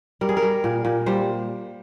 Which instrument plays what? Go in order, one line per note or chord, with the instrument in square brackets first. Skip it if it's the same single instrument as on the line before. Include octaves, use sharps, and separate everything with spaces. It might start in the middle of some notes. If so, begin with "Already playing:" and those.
[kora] G3 A#4
G#4
A#4
G3
A#2
A#2
G3 C5